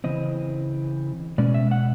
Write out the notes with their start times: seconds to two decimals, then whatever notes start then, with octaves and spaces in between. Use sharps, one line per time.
0.04 C#3 E3 C4 D#5
1.38 B2 G#3 C#4 D5
1.54 E5
1.71 F#5